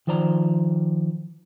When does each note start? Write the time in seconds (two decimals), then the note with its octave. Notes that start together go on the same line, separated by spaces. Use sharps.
0.07 D#3 F3 C5 D5 A#5